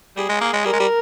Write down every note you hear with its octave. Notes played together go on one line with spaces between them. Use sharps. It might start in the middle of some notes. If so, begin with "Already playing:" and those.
G3 G#4
G#3
A#3
G#3
G3 A#4
G#3
G3